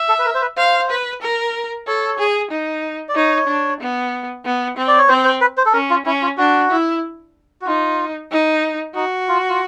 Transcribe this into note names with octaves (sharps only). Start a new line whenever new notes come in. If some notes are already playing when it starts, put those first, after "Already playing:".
Already playing: E5
A4
B4
A#4
C5
B4
C5 F5
B4
A#4
A4 C#5
G#4
D#4
D5
D#4 C#5
D4
B3
B3
C4
D5
C#5
C4 C5
C5
B4
C5
A4
C#4 A#4
F4
C#4 E4
F4
D4 F#4
E4
F#4
D#4 F4
D#4
D#4 F#4
F4
F4